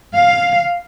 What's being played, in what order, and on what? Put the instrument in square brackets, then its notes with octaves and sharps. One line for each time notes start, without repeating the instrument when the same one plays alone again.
[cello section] F5